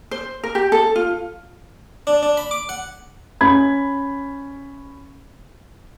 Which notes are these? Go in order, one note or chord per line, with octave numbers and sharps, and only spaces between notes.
C5
A#4
G4
A4
F4
D4
D4
B5
D6
F#5
C#4 B5 G#6